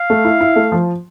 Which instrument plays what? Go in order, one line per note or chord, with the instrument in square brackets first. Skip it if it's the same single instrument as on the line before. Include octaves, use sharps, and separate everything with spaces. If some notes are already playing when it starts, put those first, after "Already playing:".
Already playing: [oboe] F5
[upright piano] A3
E4
E4
A3
F3